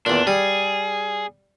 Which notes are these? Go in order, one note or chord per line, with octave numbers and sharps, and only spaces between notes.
E2 A#2 D4
G3 G#4